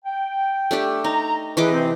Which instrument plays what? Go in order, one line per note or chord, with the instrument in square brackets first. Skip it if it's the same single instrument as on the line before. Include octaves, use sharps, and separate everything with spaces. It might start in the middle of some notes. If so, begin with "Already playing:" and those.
[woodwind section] G5
[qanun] A3 D4 G4
[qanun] D#4 [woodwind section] A#5
[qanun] E3 D#5 D6 [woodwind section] C#4 G#4 B4
[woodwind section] C3 C4